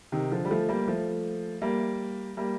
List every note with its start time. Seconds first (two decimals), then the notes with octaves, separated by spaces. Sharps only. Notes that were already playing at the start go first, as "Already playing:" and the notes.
0.12 C3 D#3
0.32 D3 F3
0.45 G3
0.50 F3 A3
0.69 G3 A#3
0.87 F3 A3
1.62 G3 A#3
2.37 G3 A#3